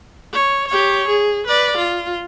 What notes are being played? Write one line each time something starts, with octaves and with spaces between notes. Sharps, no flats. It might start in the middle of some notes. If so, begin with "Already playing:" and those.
C#5
G4 C#5
G#4
B4 D5
F4